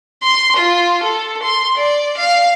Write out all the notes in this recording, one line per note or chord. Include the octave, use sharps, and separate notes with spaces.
C6
F4
A4
C6
D5
F5